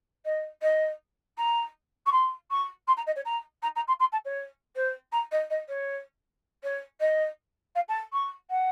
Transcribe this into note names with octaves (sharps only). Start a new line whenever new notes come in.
D#5
D#5
A#5
C#6
C6
C#6
C6
A#5
D#5
C#5
A#5
A#5
A#5
C6
C6
A5
C#5
C5
A#5
D#5
D#5
C#5
C#5
D#5
F5
A5
C#6
F#5